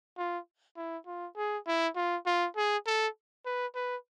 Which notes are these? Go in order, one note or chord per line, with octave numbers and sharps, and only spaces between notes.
F4
E4
F4
G#4
E4
F4
F4
G#4
A4
B4
B4